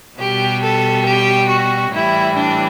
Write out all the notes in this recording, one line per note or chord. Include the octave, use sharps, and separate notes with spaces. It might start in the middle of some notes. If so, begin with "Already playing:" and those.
B2 G3 G4
A4
G4
F#4
A2 E3 G3 E4
D4